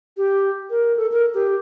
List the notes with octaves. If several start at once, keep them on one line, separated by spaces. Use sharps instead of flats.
G4
A#4
A4
A#4
G4